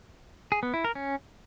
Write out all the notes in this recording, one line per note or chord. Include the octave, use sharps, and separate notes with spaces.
G#4
B3
E4
A#4
C#4